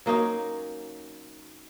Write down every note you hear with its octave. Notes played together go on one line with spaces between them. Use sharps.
F#3 A#3 C#4 D#4